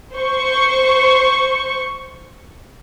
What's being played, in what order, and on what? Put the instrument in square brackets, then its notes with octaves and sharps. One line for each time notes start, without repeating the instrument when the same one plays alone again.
[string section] C5 C#6